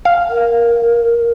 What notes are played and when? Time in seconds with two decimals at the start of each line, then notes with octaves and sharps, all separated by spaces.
0.05 F5
0.30 A#4